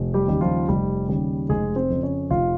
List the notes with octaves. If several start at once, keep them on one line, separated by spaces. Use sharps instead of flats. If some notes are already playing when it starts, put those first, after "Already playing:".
Already playing: F1
G3 G4
D#2 C#3 G3
F3 F4
F1 G3 G4
D#2 C#3 G3
F1 G#3 G#4
C4 C5
F2 C#3
C#4 C#5
F1 F4 F5